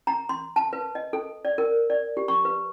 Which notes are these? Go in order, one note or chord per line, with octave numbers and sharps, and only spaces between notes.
A#5
C6
A5
B4
D#5
A4
D5
A#4
D5
G4
C#6
B4